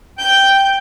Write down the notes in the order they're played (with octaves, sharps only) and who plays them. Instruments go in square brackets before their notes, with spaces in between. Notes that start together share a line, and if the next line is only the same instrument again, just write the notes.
[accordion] G5 [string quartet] G6